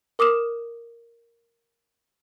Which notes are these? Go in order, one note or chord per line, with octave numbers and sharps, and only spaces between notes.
A#4 D6 D#6 F6 E7